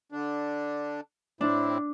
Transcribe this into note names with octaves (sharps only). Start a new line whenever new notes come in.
D3 D4
A2 C4 D4 E4